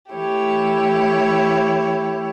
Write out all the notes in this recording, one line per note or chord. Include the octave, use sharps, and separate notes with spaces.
E3 A3 E4 G4 C#5